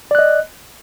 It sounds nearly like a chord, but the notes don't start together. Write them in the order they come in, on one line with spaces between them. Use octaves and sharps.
D5 F#6 D#5